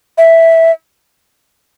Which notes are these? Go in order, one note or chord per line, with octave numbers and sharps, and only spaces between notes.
E5